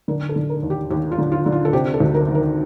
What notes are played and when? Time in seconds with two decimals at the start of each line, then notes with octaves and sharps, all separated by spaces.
0.08 D3 A#4
0.29 A4
0.36 D3
0.49 A#4
0.63 D#2
0.70 G4
0.90 D#2 G4
1.12 F4
1.18 D3
1.32 F4
1.46 D3
1.52 F4
1.65 A4
1.73 C3 G4
1.94 A4
2.00 D2
2.14 A#4
2.28 D#3
2.35 A#4